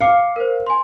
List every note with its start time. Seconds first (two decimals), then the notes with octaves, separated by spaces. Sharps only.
0.01 F5 D6 C7 C#7
0.36 A#4 C5
0.66 G#5 C6